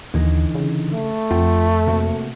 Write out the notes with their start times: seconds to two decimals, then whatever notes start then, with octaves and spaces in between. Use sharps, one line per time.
0.14 D#2 D3 E3 D#4
0.55 C#3
0.93 A3
1.31 F2 F4 F#5 G5
1.87 C3 A#3 F#4